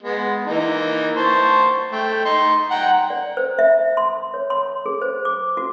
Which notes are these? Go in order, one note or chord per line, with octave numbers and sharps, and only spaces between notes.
G#3 B3
E3 A#3 D#4
C5 A5 C#6
A3 G5
D#4 C6
F#5 G5 A#5
D5
C5
E5
C6
C#5
C6
G#4
C5
D6
F#4